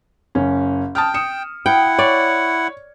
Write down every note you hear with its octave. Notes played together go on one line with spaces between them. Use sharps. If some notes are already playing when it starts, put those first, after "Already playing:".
F#1 C#4
G5 A5 D#6 F6
D#6 C#7 E7
E4 F#5 G5
C#5 D5